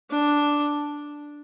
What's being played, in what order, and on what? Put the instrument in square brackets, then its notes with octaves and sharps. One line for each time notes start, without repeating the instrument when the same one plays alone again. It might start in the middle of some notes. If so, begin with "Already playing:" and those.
[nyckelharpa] D4